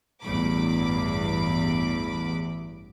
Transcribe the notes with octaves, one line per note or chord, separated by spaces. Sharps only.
A1 E2 G2 B5 D6